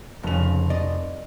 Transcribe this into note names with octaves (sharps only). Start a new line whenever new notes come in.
F1 F2 C#3 F7
D5 D#5